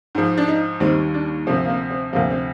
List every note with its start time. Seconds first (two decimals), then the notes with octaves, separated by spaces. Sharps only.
0.15 G#2 F3
0.38 D4
0.48 D#4
0.80 D#2 D#3 G3 C4
1.14 D4
1.47 D2 C3 F3 C4
1.65 A#3
1.69 C4
1.91 C4
2.13 D2 C3 F3 A#3
2.30 C4